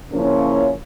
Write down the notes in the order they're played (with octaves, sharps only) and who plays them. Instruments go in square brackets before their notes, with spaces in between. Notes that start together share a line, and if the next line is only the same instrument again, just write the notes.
[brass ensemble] C#3 F3 A#3 C#4 E4